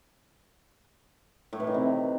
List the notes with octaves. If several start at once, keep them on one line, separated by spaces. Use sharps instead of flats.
A2
E3
D#3
C3